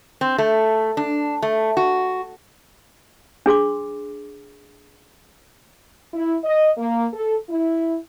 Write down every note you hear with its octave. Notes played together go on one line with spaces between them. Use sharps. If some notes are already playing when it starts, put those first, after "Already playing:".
C4
A3
D4
A3
F#4
D4 G#4 C6 D6
E4
D#5
A#3
A4
E4